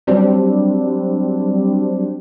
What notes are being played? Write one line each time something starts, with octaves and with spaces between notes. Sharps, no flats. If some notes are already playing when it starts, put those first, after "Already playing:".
F#3 G3 C4 D4